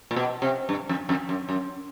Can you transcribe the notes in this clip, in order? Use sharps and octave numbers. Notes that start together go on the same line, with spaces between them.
A#2
B2
C3
G2
F2
F2
F#2
F#2